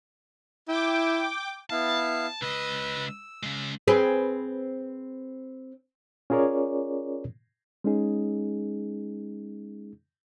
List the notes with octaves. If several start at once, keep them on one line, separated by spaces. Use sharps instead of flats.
E4 G5 D6
B3 E4 F5 A5
C#2 B4 D#5 E6
E6
C#3 G#3
C4 G#4 B4
C#4 F4 G#4 A#4 C#5 D5
G#3 C#4 D#4 G#4